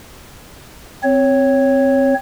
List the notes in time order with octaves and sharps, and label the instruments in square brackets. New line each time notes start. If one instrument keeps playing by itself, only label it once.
[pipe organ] C4 C#5